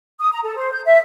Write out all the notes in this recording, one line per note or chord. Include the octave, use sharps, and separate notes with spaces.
D#6
A#5
A4
C5
G6
E5